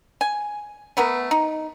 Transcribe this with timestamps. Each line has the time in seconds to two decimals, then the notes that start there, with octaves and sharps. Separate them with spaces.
0.21 G#5
0.97 A3 B3 A#4 B4
1.31 D#4